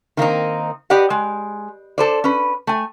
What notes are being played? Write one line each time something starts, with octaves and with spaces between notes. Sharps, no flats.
D#3 A#3 C4 D#4
G4 B4 D5 D#5 F#5
G#3
A4 C5 D5
C#4 B4
A3 G#5